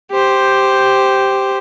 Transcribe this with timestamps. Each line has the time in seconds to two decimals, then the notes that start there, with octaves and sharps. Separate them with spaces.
0.11 G4 C5